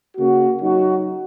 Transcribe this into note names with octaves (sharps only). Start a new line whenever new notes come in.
C#3 A#3 F#4
F#3 D#4 F#4